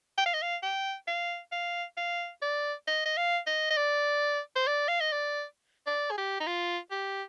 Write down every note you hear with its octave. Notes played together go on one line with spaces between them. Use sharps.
G5
F5
D#5
F5
G5
F5
F5
F5
D5
D#5
D#5
F5
D#5
D#5
D5
C5
D5
F5
D#5
D5
D5
G#4
G4
D#4
F4
G4